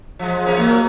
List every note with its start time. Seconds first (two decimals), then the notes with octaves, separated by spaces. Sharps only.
0.19 F3 G#3
0.45 E2 A#3 C#4
0.58 F#3 G#3 A#3